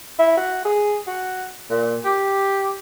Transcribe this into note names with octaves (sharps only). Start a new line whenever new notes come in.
E4
F#4
G#4
F#4
A#2
G4